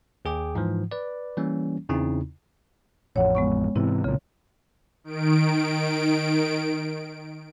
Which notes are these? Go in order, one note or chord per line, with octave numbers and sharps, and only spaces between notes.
D#2 G#4 G5 D6
G#2 E3 F3
B4 D5
E3 G3 A#3 C#4
E2 C#3 C4 D#4 E4
A1 F2 C#5 F#5
G#3 B3 C#6
G#2 C3 E3 C4 E4
B1 A#2 C#3
D#3 D7